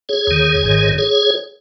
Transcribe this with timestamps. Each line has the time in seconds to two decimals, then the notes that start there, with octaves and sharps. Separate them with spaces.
0.09 G#4 C#5
0.27 D#2 D#3
0.63 G#1 G#2 D#3
0.98 G#4 C#5